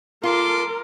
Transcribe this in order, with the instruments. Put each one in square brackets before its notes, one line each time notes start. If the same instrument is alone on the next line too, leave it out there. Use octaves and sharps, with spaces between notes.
[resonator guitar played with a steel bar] F4 [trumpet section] A4 C6 D6 [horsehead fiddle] A#4